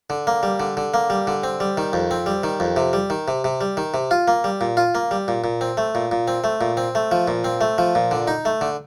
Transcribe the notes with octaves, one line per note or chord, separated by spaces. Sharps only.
D3
A#3
G3
D3
D3
A#3
G3
D3
C4
G3
D#3
F2
C4
G3
D#3
F2
C3
G3
D#3
C3
C3
G3
D#3
C3
F4
A#3
G3
A#2
F4
A#3
G3
A#2
A#2
C4
A3
A#2
A#2
C4
A3
A#2
C4
A3
F3
A#2
C4
A3
F3
A#2
D3
D#4
A3
D3